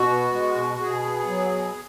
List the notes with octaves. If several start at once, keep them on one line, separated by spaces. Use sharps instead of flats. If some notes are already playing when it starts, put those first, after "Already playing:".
Already playing: B2 F#4
B3
G#3
B2
B2 G#4
B3
F#3
B2